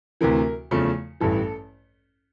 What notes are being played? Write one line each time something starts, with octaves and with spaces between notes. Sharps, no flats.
D2 C3 E3 A#4
E2 C#3 F3 A3
A1 G2 E3 A4